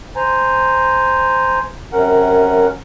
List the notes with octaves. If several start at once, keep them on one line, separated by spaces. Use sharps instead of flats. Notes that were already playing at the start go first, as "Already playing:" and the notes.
C5 G#5 A#5
F#2 C3 C#4 A#4 F#5